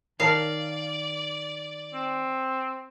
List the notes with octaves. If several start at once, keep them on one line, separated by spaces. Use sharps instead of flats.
D#3 A#4 D5 F5 A5
C4